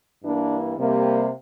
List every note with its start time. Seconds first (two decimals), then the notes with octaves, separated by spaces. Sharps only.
0.22 G2 E3 A#3 D4
0.76 C3 G3 A#3